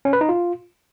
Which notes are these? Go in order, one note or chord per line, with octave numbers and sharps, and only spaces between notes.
C#4
B4
D#4
F4